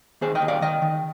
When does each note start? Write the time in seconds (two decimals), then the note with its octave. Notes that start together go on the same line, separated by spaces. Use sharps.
0.21 D#2 G#4 C5
0.35 D#5 G5
0.42 D#2
0.48 D5 F5
0.61 D#3 D#5 G5
0.82 D#3